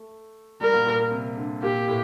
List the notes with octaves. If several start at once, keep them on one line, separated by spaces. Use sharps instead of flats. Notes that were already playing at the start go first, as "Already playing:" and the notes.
Already playing: A3
G3 A#4
A#2
A#2
A#2
C3
D3
A#2 G4
A2